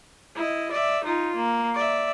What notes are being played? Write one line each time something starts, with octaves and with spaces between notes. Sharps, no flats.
E4 D#5
D5 E5
D#4 F4
A#3
D5 E5